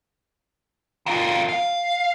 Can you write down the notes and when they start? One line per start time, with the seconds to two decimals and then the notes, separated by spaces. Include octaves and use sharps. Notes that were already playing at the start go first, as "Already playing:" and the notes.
1.06 D#3 F4
1.49 F5